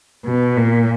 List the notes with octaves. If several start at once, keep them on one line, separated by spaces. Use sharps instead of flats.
B2
A#2